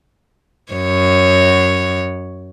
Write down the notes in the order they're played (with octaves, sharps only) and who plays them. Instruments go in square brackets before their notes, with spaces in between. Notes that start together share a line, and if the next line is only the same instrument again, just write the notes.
[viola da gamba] F#2 C#5